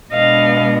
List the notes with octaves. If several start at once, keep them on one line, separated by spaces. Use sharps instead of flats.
B2 G#3 B3 D4 D#5 F5